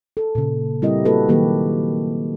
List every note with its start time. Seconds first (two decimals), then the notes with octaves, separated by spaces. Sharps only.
0.17 A4
0.35 A#2 C#3
0.82 G3 C4 E4 G4 A#4 D#5
1.05 A#3 F#4 G4 A4 B4
1.29 D#3 F#3 A#3 G4 A4 B4